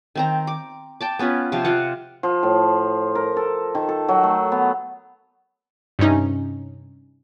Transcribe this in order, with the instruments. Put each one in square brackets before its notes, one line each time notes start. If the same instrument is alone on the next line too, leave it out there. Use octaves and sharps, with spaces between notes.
[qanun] D#3 C4 A#5
D6
G5 A5 D6
B3 C#4 F4 B4
C3 F3 C4 F5
F4 F5 F#5
[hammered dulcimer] F3
A2
A#4
A4
D#3
A4
F#3
A3
B3
[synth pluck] G2 C3 C#4 D#4